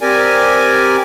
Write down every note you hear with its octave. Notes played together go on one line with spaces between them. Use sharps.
C4 G4 A#4 D5 G#5